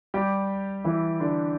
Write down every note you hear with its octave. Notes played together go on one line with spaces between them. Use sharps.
G3 G4
E3 E4
D3 D4